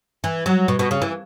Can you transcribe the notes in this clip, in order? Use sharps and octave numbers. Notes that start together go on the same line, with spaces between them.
E3
F#3
B2
B2
C#3
E3